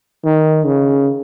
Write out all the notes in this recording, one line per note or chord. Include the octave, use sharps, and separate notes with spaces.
D#3
C#3